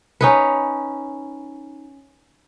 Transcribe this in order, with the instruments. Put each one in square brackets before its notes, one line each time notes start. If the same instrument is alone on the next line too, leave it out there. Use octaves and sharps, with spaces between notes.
[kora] C#4 D#4 B4